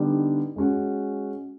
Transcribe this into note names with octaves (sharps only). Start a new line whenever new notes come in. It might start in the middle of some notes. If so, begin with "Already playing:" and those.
Already playing: D3 G3 B3 D#4 G4
G#3 C#4 F#4